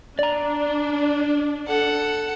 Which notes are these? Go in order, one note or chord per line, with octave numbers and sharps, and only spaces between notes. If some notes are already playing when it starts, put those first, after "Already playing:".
D4 D5 A#5
A4 F#5